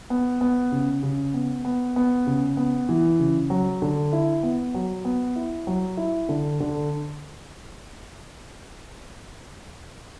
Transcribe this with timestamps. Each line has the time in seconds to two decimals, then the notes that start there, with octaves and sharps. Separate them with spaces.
0.10 B3
0.41 B3
0.72 C#3
1.03 C#3
1.34 B3
1.65 B3
1.96 B3
2.27 C#3
2.57 B3
2.89 E3
3.19 C#3
3.50 F#3
3.82 D3
4.13 E4
4.43 B3
4.74 F#3
5.05 B3
5.36 E4
5.67 F#3
5.97 E4
6.29 D3
6.60 D3